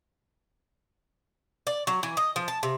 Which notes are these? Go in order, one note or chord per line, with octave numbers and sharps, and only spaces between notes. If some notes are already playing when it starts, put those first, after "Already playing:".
D5
F#3
E3
D#5
F3
A5
C3